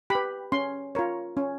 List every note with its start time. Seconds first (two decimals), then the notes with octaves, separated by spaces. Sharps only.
0.10 G4 B4 B5
0.52 C#4 C6
0.95 F4 A#4 C#5
1.37 C#4